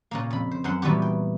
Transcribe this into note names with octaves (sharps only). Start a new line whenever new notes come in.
A#2 C#3 A#3
F2 B5
C5
F#2 C5 F#5 C6
A#2 E3 G3 B3 F#4 G4
G5